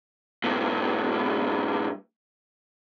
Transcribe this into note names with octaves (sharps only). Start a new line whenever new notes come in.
G2 A#2